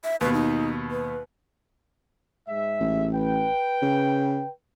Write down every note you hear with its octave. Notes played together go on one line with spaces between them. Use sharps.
E5
D#2 B2 B4
D#4
B4
G#2 G#3 E5
A1
B4 G5
C#3